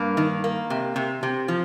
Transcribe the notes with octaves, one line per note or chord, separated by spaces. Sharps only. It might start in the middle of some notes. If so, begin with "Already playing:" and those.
Already playing: G2 A#3
D#3
A#3
C3
C3
C3
F3